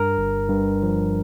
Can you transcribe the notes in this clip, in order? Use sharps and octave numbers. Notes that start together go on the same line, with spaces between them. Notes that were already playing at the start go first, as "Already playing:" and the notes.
Already playing: G2 A#4
G1
G2
F3